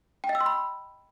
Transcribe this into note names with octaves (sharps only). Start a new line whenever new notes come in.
G5
D#5
E6
C6
B5